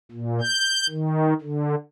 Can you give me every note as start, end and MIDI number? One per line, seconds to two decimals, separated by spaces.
0.11 0.40 46
0.41 0.87 91
0.89 1.34 51
1.41 1.75 50